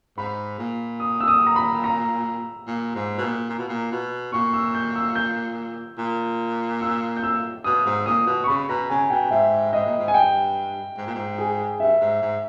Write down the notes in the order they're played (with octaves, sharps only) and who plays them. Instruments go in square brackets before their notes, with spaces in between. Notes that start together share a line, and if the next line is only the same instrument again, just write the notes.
[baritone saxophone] G#2 [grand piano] B5
[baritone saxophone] A#2
[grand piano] D#6
E6
D#6
A#5
B5
A#5
[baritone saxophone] A#2
G#2
B2
A#2
A#2
B2
A#2
B2
[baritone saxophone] A#2 [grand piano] C#6
[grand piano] E6
G6
E6
G6
[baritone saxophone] A#2
[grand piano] E6
G6
E6
[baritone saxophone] B2 [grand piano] D#6
[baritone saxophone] G#2
[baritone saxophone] A#2 [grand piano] D#6
[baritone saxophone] B2
[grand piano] C#6
[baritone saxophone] C#3 [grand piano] B5
[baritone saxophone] B2 [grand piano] A#5
[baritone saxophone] C#3 [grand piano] G#5
[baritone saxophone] B2 [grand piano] G5
[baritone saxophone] G#2 [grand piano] E5
[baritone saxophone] G#2 [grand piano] D#5
[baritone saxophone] A#2
G#2
[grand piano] G#5
[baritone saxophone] G2 [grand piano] G5
[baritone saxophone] G#2
A#2
G#2
[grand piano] G#4
[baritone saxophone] G2 [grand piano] E5
[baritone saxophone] G#2
G#2